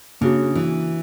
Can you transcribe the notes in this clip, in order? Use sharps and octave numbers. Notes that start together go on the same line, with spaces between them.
C#3 A#3 D4 F#4
E3